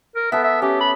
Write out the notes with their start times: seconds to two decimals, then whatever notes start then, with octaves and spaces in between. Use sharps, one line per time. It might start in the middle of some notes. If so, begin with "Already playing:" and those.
0.16 A#4
0.32 B3 A4 E5
0.44 E5
0.62 C#4 G4
0.81 B5